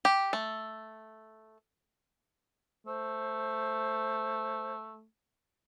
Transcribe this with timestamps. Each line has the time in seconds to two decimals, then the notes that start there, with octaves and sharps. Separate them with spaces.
0.05 G4
0.33 A3
2.87 A3 C5